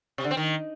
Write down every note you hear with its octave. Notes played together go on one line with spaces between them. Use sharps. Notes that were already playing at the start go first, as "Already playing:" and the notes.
C3
D3
C4
D#3